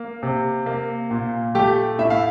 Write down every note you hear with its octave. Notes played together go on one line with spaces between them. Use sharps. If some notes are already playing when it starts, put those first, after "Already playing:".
Already playing: A#3
C3
A#3
A#2
A3 G4
A2 E5
F5